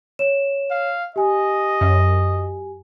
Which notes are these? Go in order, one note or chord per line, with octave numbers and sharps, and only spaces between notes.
C#5 E7
F5
G4 D#5 G#5
F#2